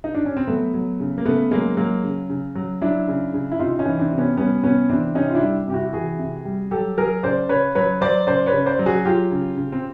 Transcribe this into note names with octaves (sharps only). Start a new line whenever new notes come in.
D#4
D4
C#4
C4
F#3 A3 B3
F#3
C#3
A#3
C#3 A3 B3
F#3 G#3 A#3
F#3 G#3 A#3
C#3
C#3
F#3
F#3 D4 E4
C#3
C#3
E4
C3 D#4 F4
C#4 D#4
E3
C4 D4
C3
B3 C#4
G3 B3 C#4
C3 B3 C#4
E3 C4 D4
C3 C#4 D#4
F4
D4 E4
G3
C3 G4
E4 F#4
E3 F#4 G#4
C3
G3
F#3 G4 A4
F#3 G#4 A#4
C#3 C5 D5
C#3 B4 C#5
F#3 B4 C#5
F#3 C5 D5
C#3 C5 D5
B4 C#5
C#3
C5 D5
F#3
F#4 G#4
F#3 F4 G4
C#3
C#3
C4